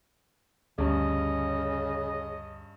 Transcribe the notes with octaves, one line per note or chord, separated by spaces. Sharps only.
D2 G2 C#3 C#4 D#5